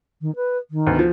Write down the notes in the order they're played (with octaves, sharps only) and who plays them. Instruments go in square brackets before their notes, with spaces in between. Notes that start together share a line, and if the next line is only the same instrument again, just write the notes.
[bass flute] D#3
B4
D#3
[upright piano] D2 B3
F3